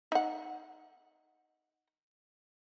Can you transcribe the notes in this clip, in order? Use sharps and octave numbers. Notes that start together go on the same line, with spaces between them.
D#4 F#5